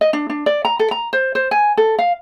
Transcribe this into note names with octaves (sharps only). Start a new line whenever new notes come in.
D#5
D4
D4
D5
A#5
A4
A#5
C5
C5
G#5
A4
F5